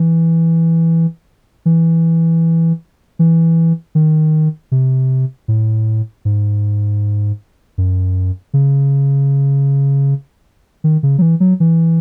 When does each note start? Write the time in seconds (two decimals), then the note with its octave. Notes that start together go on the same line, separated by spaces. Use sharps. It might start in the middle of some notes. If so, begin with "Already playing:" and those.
Already playing: E3
1.66 E3
3.19 E3
3.95 D#3
4.72 C3
5.48 A2
6.25 G#2
7.78 F#2
8.54 C#3
10.84 D#3
11.03 C#3
11.18 F#3
11.22 E3
11.40 F#3
11.60 E3